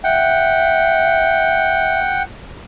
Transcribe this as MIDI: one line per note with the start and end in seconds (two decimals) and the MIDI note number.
0.04 2.00 76
0.04 2.23 78
0.04 2.23 79